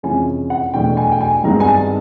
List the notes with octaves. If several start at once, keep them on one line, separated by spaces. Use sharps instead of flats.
F2 C3 E3 G#3 C#4 G#5
F#5
E2 B2 F#3 A3 D4 G5
G#5
G5
G#5
G#1 G2 D#3 G#3 B3 A#5
G#5
A5